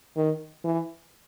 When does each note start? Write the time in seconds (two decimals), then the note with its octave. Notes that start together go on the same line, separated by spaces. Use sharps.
0.16 D#3
0.65 E3